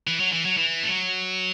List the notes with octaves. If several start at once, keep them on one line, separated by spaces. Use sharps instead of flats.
E3
F#3
E3
F#3
E3
A3
F#3